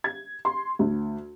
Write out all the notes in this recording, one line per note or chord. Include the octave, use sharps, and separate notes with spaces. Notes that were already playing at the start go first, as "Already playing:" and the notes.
G#6
C6
D2